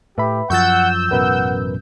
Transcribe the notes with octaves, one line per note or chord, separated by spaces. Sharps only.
A2 G4 B4 E5 B5
F#2 F3 F#5 C#6 E6 G6 A6
A1 F#2 B2 A#4 B4 F#5